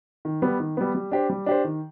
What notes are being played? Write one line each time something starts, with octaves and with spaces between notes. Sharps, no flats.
D#3
G3 B3
D#3
G3 B3
G3
D4 G4 C5
G3
D4 G4 C5
D#3